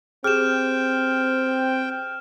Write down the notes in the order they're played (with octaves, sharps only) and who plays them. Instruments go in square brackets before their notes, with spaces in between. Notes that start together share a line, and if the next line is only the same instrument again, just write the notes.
[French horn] C4 [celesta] G4 G#4 [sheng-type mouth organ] G5 [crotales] F6 E7